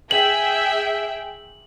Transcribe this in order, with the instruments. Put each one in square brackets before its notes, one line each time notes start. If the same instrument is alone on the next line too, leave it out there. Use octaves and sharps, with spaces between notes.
[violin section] G#4 E5 G5 [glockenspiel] F#7